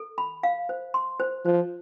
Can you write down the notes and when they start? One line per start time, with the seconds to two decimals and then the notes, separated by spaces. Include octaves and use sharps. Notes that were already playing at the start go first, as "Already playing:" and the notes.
Already playing: A4
0.18 B5
0.43 F5
0.69 C5
0.94 C6
1.20 C5
1.45 F3 C5